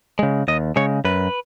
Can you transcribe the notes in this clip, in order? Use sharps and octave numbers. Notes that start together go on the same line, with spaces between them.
C#3 G#3
D#2 D#5
C#3 G#3 C#5
F#2 B4